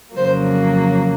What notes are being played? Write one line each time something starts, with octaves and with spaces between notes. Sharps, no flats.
F2 C#3 F#3 A#3 C5